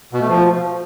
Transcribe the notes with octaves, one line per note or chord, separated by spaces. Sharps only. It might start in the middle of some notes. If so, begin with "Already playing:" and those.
B2
A3
F3